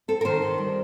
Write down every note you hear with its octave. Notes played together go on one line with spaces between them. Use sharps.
C4 A4
A#4
D#3 C5
D#3
G3